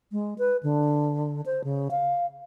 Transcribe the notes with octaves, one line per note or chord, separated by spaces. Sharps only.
G#3
B4
D3
C5
C#3
F5